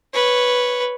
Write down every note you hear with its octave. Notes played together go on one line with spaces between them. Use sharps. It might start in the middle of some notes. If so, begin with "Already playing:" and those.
B4 C#5